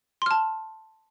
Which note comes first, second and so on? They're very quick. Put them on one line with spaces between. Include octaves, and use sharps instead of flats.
C6 F6 A5